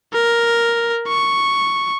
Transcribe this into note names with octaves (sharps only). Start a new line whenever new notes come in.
A#4
C#6